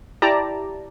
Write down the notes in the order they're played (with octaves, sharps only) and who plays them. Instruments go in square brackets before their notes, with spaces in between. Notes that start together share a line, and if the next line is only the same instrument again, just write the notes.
[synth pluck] E4 G4 D5 A5 A#5